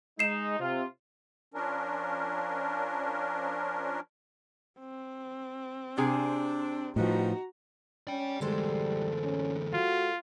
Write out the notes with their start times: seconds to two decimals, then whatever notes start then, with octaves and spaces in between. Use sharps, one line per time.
0.19 G#3 D#4 C7 E7
0.60 C3 F4
1.54 F3 C#4 D4 A#4
4.79 C4
5.98 C3 D4 G#4 G#5
6.96 A2 F3 G3 B3 D#4 F#4 A#5
8.07 C#4 D5 G5
8.41 D2 E3 G3 G#3 A4 C5
9.23 C#4
9.73 F4 F#4